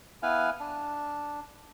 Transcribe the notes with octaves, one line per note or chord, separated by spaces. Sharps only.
B3 E4 B4 F5 G#5
D4